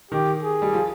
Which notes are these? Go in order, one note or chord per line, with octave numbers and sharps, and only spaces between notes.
D#3 G4
G#4
G3
F3